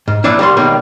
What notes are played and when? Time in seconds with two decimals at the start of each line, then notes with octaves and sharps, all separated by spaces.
0.08 G#2
0.24 A#2 E3 F3 D4 E4
0.39 C2 G3 C6
0.57 C#2 B2 D#3 G3 A#3